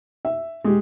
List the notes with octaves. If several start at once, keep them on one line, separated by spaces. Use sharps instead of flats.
E5
G#3 G4